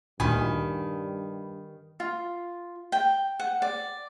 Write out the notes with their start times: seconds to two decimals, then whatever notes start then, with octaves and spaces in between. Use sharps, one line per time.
0.20 D2 G2 A#2 D#3 G#5 B5
2.00 F4
2.92 G5
3.39 F#5
3.62 D5